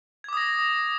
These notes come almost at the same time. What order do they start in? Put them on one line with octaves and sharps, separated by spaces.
G#6 D6 D#6 A#6